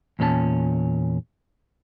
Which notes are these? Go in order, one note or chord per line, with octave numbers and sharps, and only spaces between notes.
E2 A#2 C#4 A4 A5